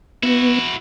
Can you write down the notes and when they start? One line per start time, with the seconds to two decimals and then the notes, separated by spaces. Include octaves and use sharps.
0.23 B3 E4 F#4